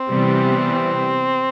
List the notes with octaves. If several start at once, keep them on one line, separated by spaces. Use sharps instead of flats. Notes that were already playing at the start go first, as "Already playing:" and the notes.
Already playing: C4
C3 E3 G3 B3